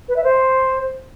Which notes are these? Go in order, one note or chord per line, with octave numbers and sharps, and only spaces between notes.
B4
E5
C5